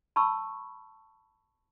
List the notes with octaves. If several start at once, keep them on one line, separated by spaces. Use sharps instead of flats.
A5 B5 C#6 E6